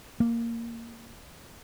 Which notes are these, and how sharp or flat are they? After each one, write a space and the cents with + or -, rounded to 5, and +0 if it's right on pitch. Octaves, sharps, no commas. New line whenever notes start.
A#3 -10